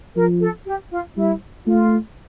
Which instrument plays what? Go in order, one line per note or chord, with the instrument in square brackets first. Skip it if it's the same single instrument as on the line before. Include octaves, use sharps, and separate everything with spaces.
[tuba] F3 [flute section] A#4
[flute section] A4
G4
F4
[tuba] G3 [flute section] E4
[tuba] A3 [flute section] F4